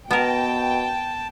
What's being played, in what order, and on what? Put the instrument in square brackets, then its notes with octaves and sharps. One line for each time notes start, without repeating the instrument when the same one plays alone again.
[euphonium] B2 [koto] B3 A#4 [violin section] G5 [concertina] A5